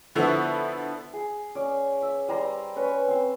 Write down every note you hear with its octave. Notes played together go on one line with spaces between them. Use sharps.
D3 F3 B3 E4 E5 C#6
G#4
C#4 D5
E5
G3 C5 A#5 C6
C#4 B4 C#5
C4 C5